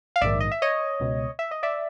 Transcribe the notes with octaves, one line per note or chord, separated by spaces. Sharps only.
F5
A#1 G#2 D#3 D5 E5
D#5
E5
C#5 D#5
C#2 B2
E5
D#5
D5 E5